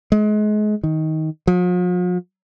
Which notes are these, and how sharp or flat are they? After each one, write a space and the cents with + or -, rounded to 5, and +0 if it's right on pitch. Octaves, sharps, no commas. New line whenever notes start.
G#3 +30
D#3 +15
F3 +45